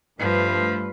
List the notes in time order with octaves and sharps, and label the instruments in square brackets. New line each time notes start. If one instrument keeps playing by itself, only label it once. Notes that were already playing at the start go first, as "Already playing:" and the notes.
[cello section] G2 A3 B4 [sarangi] F3